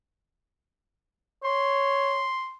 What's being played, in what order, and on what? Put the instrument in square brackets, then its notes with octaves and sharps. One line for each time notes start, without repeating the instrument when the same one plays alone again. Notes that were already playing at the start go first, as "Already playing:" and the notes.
[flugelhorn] C#5 [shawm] C6